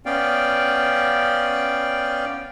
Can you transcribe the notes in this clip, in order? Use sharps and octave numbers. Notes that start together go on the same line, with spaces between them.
B3 C#4 D5 F5 G5